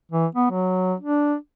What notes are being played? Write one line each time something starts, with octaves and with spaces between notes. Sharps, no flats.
E3
B3
F#3
D4